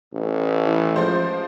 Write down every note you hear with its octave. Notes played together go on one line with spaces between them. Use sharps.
A1
E3
F3 G#3 C5